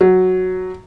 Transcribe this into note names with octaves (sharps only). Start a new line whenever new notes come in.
F#3